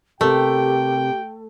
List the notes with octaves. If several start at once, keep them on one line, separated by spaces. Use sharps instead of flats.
C3 A3 G4 A#4 G5